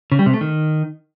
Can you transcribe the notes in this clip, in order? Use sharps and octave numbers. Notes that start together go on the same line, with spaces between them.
C#3
G3
C3
A3
D#3